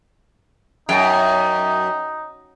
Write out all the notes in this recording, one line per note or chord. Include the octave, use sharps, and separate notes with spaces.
F#2 D#4 G5 G#5 A#5